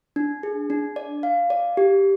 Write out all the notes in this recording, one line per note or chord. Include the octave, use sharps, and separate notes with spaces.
D4
G#4
D4
D5
F5
D5
G4